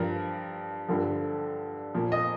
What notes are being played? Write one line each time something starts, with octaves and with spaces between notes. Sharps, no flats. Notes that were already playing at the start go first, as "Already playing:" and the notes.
Already playing: G2 F3 A#4
G2 D3 F3
A#2 F3
D#5